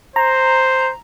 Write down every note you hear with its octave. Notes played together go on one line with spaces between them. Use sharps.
C5 A#5